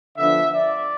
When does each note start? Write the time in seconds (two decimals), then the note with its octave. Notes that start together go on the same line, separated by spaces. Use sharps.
0.17 D3 F3 B3 D4 E5
0.53 D5